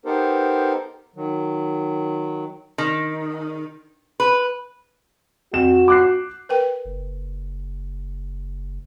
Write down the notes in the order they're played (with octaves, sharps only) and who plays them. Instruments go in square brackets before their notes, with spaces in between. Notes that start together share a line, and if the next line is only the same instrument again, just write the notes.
[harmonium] B3 D#4 G4 A4 A#4 C5
D#3 F#3
[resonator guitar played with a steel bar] D#3
B4
[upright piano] F2 E7 [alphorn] F#4
[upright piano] D6 F#6 C7
[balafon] A#4 B4 G5
[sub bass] F#1